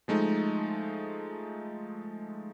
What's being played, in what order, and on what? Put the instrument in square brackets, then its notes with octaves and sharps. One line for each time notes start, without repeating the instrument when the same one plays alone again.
[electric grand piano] F3 G#3 A3 D#4